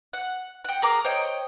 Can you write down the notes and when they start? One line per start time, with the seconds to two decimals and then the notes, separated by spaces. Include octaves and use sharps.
0.13 F#5
0.64 F#5 G5
0.82 G#4 A#4 A#5 D6
1.05 C5 C#5 D#5 G5